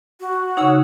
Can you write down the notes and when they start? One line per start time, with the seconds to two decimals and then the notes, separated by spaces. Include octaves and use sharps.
0.20 F#4
0.57 C#3 D#4 C#5 F#5 E6